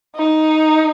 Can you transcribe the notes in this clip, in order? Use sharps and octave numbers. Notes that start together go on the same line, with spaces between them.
D#4